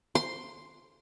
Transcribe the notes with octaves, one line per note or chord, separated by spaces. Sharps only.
C6